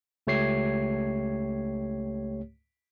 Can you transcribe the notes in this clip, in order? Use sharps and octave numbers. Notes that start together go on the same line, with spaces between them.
C#2 A3 G4 C#5 G#6 C7